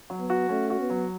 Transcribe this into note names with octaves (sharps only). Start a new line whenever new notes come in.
F#3
B3
F#4
A3 C#4
F#4
B3
F#3